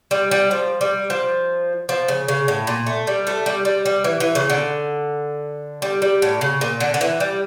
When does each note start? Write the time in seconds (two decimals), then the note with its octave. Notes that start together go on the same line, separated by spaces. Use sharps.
0.11 G3
0.31 G3
0.51 F3
0.81 G3
1.10 F3
1.89 F3
2.08 C#3
2.28 C#3
2.48 A2
2.67 A#2
2.87 A3
3.07 G3
3.27 A3
3.46 G3
3.65 G3
3.85 G3
4.04 E3
4.20 E3
4.35 C#3
4.50 D3
5.82 G3
6.02 G3
6.22 A2
6.41 C#3
6.61 A#2
6.80 D3
6.94 D3
7.01 E3
7.20 G3